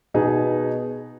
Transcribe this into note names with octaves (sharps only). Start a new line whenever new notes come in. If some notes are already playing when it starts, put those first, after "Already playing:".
B2 B3 D#4 G#4 B4